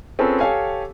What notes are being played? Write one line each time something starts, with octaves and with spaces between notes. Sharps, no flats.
C4 C#4 F4 G#4 A4 B4
G4 A4 C#5 F5 G#5